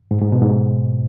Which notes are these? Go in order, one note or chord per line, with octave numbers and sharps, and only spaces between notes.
G#2
G#2
B2
G#2